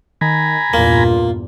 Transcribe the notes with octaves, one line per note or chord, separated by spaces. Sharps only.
D#3 G#5 A#5 B5
E2 G2 A#2 A#3 F4